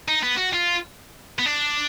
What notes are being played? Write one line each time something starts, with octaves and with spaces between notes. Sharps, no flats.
D#4
B3
F#4
F4
B3
D4